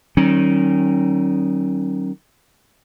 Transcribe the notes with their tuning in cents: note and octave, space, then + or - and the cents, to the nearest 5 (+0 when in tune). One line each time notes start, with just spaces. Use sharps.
D#3 -10 F#3 +45 C#4 -35